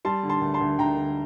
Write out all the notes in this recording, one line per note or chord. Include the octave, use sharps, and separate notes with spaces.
G3 A5 C6
D3
A5 C6
D2
A5 C6
D2
D2 G5 A#5
D3